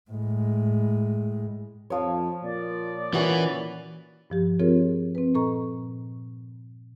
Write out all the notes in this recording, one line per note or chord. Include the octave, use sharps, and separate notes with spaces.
A2 G#3
F2 F3 C#5
A#2 D5
A#2 E3 C#4 E4 F#4 D#6
G2 F3 G4
F3 C4 F4 G#4 A#4 C#5
C4 B4
A#2 A4 D#5 A#5 C#6